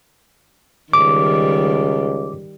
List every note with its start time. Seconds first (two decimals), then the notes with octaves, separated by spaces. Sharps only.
0.93 C#2 D#3 G3 D6